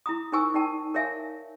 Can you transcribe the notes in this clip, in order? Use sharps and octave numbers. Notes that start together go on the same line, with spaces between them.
E4 A#5 D#6
D#4 A#4 C5 G#5 C#6 E6
D#4 D5 G5 A5
A#4 C#5 D5 E5 F5 G#5